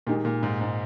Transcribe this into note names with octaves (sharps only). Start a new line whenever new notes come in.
A#2 D#3 G#3 D#4 G4 A#4
A#2
G#2
G#2